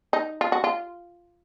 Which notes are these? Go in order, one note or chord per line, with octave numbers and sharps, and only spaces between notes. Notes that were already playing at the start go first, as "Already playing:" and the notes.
D#4
F4
F#4
F4